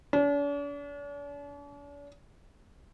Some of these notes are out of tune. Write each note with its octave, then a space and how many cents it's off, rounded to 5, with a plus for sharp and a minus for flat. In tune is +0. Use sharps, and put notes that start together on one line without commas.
D4 -45